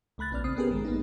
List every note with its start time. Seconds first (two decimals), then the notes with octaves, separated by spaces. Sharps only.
0.18 C#2 A3 B5 F#6 A6
0.31 A#1 B3 C#4 D5 F6
0.44 C#3 C4 D#6 C7
0.56 B3 C#4 G4 G#4 A#4 B4
0.69 A1 G2 D#3 G#3
0.85 A#3 B3 D#4